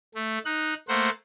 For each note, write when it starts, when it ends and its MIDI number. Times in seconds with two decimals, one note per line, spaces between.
0.15 0.38 57
0.45 0.74 63
0.45 0.74 90
0.88 1.10 57
0.88 1.10 58
0.88 1.10 72
0.88 1.10 78